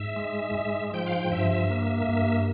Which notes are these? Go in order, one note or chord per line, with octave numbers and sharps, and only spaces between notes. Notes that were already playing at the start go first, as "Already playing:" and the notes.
Already playing: G#2 E5
G#3
G#2
F3 G5
F5
G5
G2 E5
E5
A#3
G2